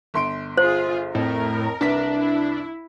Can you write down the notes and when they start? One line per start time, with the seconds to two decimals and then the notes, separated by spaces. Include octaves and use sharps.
0.14 G1 C6 D7
0.58 F4 G#4 C5
1.15 F2 A2 A#4
1.81 C2 D4 B4 B6
2.16 E4